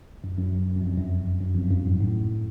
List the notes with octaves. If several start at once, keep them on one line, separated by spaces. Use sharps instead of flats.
F#2
F#2
F#2
F2
F#2
F#2
F2
G2
F#2
G#2
A2